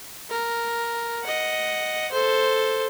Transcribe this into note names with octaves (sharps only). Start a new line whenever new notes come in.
A#4
D#5 F#5
A4 C5